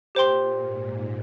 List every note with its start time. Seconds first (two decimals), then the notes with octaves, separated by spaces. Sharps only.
0.15 A#2 G4 C5 G5 C6
0.59 G#2